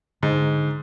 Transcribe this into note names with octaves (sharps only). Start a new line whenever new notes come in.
G#2 D3